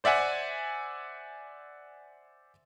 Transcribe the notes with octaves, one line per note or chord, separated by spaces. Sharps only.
C5 D5 E5 F#5 G#5